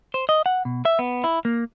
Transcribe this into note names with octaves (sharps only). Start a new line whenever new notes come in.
C5
D#5
F#5
B2
E5
B3
E4
A#3